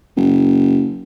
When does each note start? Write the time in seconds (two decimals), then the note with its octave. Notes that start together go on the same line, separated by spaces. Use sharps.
0.16 F#1